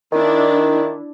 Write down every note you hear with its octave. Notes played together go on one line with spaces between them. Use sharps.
D#3 D4 E4